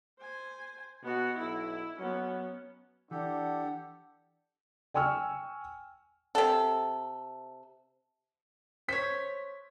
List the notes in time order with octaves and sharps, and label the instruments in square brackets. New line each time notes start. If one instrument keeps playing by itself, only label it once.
[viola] C5 G#5
[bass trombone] B2 [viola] B3 F#4
[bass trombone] B1 [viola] E4
[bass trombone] F#3 [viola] B3 C#4
[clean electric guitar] E3 [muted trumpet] D4 [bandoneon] G4 A4 [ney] F#5
[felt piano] G5 G#5 C#6 E6 F6
[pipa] C3 A4
[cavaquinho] C5 C#5 [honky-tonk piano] B6